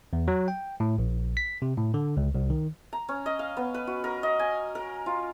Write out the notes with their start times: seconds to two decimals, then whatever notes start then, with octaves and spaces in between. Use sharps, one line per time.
0.13 E2
0.28 F#3
0.48 G5
0.80 A2
0.98 A#1
1.37 B6
1.62 C3
1.77 A2
1.94 D3
2.17 C#2
2.35 C2
2.50 D#3
2.93 A#5
3.08 C#4
3.26 D#5
3.39 F5
3.57 B3
3.74 B4
3.87 F#4
4.04 A#4
4.23 D#5
4.39 G#5
4.75 A#4
5.06 F4